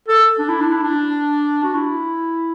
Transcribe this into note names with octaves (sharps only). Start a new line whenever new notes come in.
A4
D4
E4
D4
E4
D4
F#4
E4